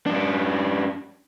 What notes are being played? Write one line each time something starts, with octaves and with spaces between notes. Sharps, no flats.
F#2 D4